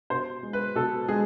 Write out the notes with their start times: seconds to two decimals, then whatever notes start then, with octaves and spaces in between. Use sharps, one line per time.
0.10 B2 C5
0.43 G#3
0.53 B4
0.75 B2 A4
1.08 G#3 G#4